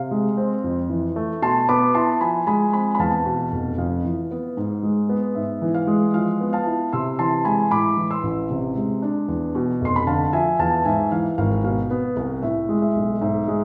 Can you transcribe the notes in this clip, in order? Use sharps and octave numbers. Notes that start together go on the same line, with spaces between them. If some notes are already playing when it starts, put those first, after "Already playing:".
Already playing: C3 F5
G#3
C4
F2
E3
A3
B2 A5 C6
B3 B5 D6
E4 A5 C6
F3 G#5 B5
G#3 G#5 B5
C4 G#5 B5
B5
E2 F5 A5
B2
F1
F2 F5
E3
B3
G#2
G#3
B3
G#2 E5
E3
F5
G#3
F3 F5
B3
F5 A5
E4
C3 C6 E6
E3 A5 C6
G#3 G#5 B5
A2 B5 D6
E3
C6 E6
A1
C3
G#3
D4
E2
B2
F1 C6
B5
D3 F5 A5
F3 E5 G#5
E2 F5 A5
G#2 E5 G#5
E3 F5
G#1 F5
B2 F5
B3
C2
A2 E5
G#3
E5
B1
G#2 E5
G#3